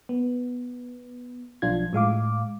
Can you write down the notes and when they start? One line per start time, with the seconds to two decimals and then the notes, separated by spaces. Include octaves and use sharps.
0.09 B3
1.62 B1 F3 D4 F4 G#6
1.93 A2 G#3 F5 D6